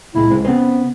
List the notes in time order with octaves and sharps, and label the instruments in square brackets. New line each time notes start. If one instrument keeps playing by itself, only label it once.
[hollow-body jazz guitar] C#2 A#2 G#3 [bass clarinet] E4
[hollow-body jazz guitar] C#2 G#3 C4
[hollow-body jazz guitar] C#3 C4 B4 [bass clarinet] B3